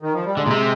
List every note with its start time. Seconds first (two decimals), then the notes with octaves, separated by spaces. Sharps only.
0.02 D#3
0.13 F3
0.25 G3
0.37 D3 G#3
0.46 A#2
0.50 C3